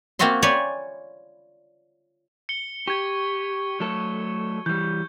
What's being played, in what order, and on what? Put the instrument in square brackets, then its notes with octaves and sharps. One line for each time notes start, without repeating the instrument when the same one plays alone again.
[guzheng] A#3 C4 F4 F#4 E5 C6
C#5 D5 G5 G#5 B5
[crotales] C#7 G7
[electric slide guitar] G4 [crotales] C#6 G#6
[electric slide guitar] F#3 A3 A4
[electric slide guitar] E3 G3 [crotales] G6